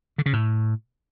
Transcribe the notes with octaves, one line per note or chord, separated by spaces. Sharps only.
D3
C#3
A2